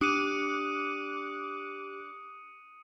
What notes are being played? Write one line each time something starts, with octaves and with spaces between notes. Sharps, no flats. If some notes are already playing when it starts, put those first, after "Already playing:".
D4 G4 D6 D#6 F#6 C#7 D#7